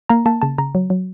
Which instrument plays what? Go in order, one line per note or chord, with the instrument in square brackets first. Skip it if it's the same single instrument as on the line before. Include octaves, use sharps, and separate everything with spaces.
[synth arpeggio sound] A#3 A#5
A#3 A5
C#3 A5
C#3 A#5
F#3
F#3